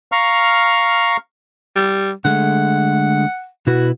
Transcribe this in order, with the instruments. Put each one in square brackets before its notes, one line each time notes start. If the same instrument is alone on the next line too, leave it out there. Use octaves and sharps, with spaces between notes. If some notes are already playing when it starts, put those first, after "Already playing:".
[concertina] F5 A#5 C#6 F6
[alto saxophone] G3
[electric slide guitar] D3 G#3 A3 [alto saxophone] F#5
[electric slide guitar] B2 E4 B4 [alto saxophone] F#4